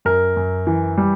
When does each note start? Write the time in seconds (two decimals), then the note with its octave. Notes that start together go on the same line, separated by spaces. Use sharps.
0.05 F#2 A#4
0.37 F#2
0.67 E3
0.98 G3